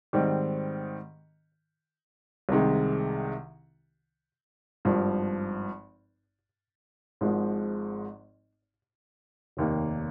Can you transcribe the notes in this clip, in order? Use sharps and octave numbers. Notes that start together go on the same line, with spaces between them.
G#2 D#3 G3 C4
C2 C3 D#3 G#3
G#1 G2 F3
G#1 G#2 F3 G#3
F1 D#2 D#3 A#3